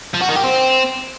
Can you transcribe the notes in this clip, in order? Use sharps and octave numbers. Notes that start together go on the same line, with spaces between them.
F3
F#4
D#3
G4
C4